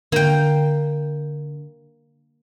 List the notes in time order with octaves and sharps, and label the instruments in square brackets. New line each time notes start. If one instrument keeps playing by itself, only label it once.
[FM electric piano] D3 [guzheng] A#3 G5